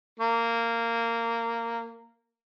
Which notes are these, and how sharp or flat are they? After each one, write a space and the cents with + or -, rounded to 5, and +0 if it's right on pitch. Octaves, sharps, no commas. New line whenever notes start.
A#3 -15